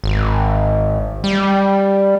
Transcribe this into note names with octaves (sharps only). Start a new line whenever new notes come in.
G#1
G3